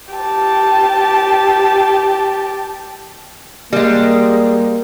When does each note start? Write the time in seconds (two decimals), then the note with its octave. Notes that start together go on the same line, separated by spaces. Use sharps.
0.14 G4 A5
3.73 G3 G#3 A#3